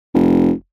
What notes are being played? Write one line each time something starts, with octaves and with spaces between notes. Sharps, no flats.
F1